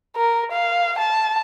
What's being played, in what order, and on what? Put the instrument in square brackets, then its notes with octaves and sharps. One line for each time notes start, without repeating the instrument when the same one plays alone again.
[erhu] A#4
F5
A5